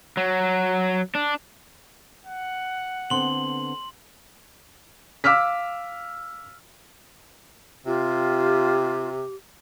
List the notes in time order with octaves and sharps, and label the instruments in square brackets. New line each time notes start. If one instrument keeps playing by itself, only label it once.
[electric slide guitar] F#3
D4
[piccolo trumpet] F#5
[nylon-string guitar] D3 B3 C4 [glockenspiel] C6 F#7
[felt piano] F5 D6 E6 F6 B6
[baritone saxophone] C3 [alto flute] F4 [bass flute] G4